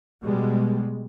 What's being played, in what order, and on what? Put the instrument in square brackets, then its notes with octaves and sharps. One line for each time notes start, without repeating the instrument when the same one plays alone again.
[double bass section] B2 G3 G#3